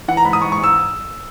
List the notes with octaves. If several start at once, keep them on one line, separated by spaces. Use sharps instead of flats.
E3 F#5
A#5
G#2 B5
D#6
G#2 C#6
C#6
G#2
E6